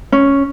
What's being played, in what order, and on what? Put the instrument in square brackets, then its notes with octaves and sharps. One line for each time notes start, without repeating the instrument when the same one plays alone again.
[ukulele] C#4